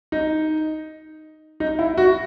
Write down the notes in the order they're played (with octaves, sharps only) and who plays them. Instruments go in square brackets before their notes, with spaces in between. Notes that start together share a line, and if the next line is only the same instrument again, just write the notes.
[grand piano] D#4
D#4
E4
F#4